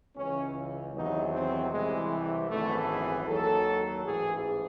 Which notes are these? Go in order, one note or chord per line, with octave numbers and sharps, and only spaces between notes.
C#2 C#3 E3 C#4
E2 C3 D#3 F#3 D#4
C4
C2 C3 E3 G#3
G#1 F#2 E3 A3
G#4
D#2 D#3 F#3 A4
A1 G#2 E3 G#4